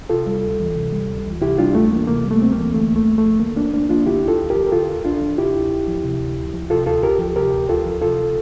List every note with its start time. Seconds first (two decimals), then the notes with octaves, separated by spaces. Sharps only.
0.10 C3 F4 A4
0.26 G3
0.43 D2
0.60 E3
0.76 C3
0.92 G3
1.09 D2
1.26 E3
1.41 C3 E4 G4
1.59 G3 D4 F4
1.75 D2 A3
1.92 E3 A#3
2.08 C3 A#3
2.25 G3
2.31 A3
2.42 D2 C4
2.52 A#3
2.57 E3
2.74 D3 A3
2.91 D2
2.96 A3
3.07 D2
3.18 A3
3.24 F3
3.40 D3 A#3
3.56 D2 A#3 D4
3.73 D2 A#3 D4
3.89 F3 D4 F4
4.06 D3 E4 G4
4.23 D2
4.28 F4 A4
4.39 D2
4.50 G4 A#4
4.56 F3
4.66 A#4
4.72 D3 F4 A4
4.89 D2
5.05 D2 D4 F4
5.21 F3
5.38 C3 E4 G4
5.55 D2
5.71 D2
5.87 F3
6.04 C3
6.20 D2
6.37 D2
6.54 F3
6.70 C3 F4 A4
6.86 D2 F4 A4
7.03 D2 G4 A#4
7.19 F3
7.36 C3 G4 A#4
7.53 D2
7.69 D2 F4 A4
7.86 F3
8.02 C3 F4 A4